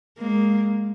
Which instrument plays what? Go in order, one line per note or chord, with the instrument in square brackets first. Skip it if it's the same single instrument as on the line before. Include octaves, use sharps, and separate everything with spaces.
[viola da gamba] G#3 A#3